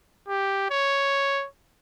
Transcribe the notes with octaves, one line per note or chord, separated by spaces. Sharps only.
G4
C#5